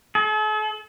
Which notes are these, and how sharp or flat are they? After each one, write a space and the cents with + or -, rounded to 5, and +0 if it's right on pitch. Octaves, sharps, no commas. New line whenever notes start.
A4 -45